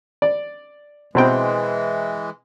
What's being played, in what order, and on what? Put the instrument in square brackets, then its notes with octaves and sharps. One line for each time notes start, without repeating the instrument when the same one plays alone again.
[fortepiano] D5
[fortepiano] B2 C4 G5 [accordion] E3 G#3